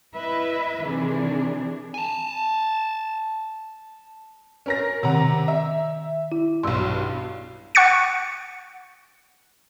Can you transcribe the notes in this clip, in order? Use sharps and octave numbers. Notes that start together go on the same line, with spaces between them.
E4 B4 D#5 E5
C3 D#3 E3 D4 G#4
G#5 A5
C#4 A#4 A#6
C3 D#3 F#5 A#5
E5
E4
B1 G2 C6 E6
F#5 C#6 F#6 A6 C#7